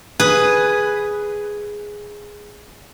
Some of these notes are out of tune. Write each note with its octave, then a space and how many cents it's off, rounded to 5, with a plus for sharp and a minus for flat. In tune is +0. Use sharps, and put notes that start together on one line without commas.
G#4 +0 B4 +0